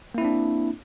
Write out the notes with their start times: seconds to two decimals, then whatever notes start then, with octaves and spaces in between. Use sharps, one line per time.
0.15 A#3
0.18 E4
0.21 C4
0.25 D4